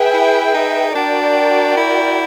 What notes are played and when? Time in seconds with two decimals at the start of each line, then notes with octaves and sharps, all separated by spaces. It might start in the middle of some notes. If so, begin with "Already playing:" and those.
Already playing: G#4 B4 E5 G5
0.14 E4
0.54 D#4
0.95 D4 F#4 A#4 D5 G5
1.77 E4